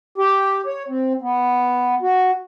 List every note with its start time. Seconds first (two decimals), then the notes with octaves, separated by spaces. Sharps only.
0.18 G4
0.66 C#5
0.88 C4
1.22 B3
2.02 F#4